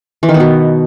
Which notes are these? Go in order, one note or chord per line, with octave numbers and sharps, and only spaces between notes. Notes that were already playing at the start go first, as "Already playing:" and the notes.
E3
D#3
B3
B2